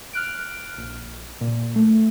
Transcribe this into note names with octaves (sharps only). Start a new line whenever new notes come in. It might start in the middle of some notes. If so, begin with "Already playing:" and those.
F6 F#6 D7
A#1
A#2
A3